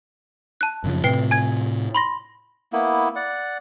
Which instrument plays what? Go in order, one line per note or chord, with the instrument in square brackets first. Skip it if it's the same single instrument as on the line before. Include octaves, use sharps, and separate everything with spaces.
[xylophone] A5 F#6
[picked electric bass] F#2 C#3 F3
[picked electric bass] A2 C3 [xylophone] B4 G5 C7
[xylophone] G#5 G#6
B5 C6 A#6
[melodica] A#3 B3 E4
D5 F#5